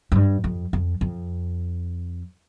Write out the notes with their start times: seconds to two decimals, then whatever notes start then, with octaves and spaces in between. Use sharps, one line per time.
0.12 F#2
0.15 G2
0.44 F2
0.73 F2
1.01 F2